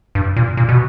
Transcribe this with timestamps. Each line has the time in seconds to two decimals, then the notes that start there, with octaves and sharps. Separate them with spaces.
0.15 G2
0.36 A#2
0.57 A#2
0.69 B2